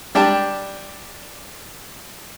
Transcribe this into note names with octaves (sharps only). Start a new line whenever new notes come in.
G3 D4 G5 A5